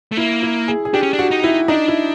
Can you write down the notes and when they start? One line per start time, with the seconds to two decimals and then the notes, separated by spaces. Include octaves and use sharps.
0.12 A3
0.17 A#3 E4
0.43 E4
0.68 G#4
0.85 G#4
0.94 D4 G4
1.03 C#4
1.13 D4
1.19 F#4
1.31 D#4
1.44 E4
1.68 D4 D#4
1.88 E4